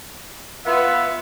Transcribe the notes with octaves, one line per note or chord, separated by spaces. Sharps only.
B3 F4 E5